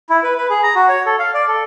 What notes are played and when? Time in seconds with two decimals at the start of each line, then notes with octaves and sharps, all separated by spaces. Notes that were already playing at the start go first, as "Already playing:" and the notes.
0.10 E4
0.23 B4
0.38 B4
0.50 G#4
0.63 A#5
0.75 F#4
0.89 C#5
1.06 A4
1.19 F5
1.34 D5
1.48 A4